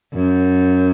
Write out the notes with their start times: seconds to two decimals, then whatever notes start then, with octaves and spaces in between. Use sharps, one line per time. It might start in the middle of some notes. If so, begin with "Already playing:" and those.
0.14 F#2